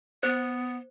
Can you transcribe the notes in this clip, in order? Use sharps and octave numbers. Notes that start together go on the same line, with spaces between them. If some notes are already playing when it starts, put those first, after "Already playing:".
B3 C5